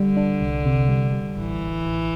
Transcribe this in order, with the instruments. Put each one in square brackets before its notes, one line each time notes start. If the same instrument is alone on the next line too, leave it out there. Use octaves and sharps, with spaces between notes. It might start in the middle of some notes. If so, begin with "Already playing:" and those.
Already playing: [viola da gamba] D3 [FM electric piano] G3
[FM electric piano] D4
C2
C3
G3
G3
[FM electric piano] A1 [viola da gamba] E3
[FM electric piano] A1
A1